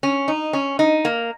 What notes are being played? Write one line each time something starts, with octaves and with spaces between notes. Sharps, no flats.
C#4
D#4
C#4
D#4
A#3